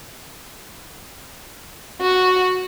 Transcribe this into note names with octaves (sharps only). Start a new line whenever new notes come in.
F#4